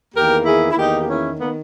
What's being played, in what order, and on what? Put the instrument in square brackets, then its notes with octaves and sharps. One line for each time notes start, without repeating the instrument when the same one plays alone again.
[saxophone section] E2 D#3 A#3 G4 A#4
E4 G#4
E4
E2 D#3 A#3 D#4 G4
G4
C#4 E4
D#3 A#3 B3